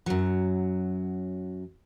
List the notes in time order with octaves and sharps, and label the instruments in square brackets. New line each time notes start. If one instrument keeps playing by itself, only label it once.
[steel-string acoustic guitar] F#2 F#3